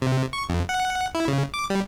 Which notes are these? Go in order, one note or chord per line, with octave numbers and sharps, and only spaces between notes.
C3
C#6
F2
F#5
E4
C#3
D6
G3